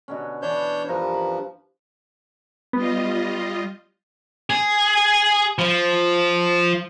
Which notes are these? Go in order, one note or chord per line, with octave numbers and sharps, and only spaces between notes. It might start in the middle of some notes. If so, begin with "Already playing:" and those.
B2 D3 C#4
E3 D4 C#5 G6
G2 F3 A#4 B4
B5
G3 B3 F4 D#5
G#4
F3